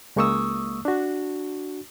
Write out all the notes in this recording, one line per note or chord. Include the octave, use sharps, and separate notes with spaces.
C#2 G#3 A#3 C#6 D#6 E6
D4 F#4